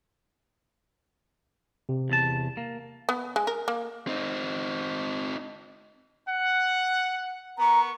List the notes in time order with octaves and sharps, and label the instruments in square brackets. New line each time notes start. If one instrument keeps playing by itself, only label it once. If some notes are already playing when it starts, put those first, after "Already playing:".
[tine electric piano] C3
[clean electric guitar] E2 A5
A#3
[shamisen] B3
G#3
A#4
A#3
[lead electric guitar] C4 D#4
[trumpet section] F#5
[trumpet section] B3 A#4 C#6 [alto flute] A#5